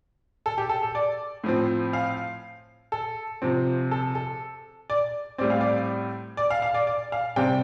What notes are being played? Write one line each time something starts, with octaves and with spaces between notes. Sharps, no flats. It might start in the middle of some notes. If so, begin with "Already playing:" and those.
A4
G4
A4
A4
D5
A2 F3 C4
F5
A4
C3 F3 C4
A4
A4
D5
A2 G3 C4 D5
F5
D5
D5
F5
F5
D5
D5
F5
C3 G3 C4 G5